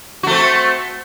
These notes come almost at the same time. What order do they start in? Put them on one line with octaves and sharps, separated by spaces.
F#4 A3 C4